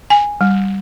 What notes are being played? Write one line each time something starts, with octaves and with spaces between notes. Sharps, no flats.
G#5
G3